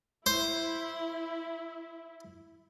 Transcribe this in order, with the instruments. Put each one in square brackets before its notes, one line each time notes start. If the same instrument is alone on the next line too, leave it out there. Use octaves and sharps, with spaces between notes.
[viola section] E4 [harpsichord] C5